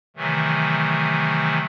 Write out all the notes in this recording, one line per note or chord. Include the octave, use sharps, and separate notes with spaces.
C3 D#3 E3 F#3 A3